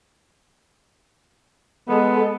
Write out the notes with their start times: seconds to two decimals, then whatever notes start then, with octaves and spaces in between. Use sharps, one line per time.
1.88 G#3 B3 A4